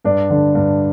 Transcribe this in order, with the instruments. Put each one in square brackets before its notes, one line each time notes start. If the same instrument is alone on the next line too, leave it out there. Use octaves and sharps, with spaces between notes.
[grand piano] G2 D4
D3
G2